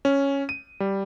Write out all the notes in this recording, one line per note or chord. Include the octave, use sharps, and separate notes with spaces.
C#4
D#7
G3